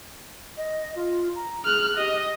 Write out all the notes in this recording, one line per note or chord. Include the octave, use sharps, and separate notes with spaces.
D#5
F4
A#5
G#4 F6 F#6
G4 D#5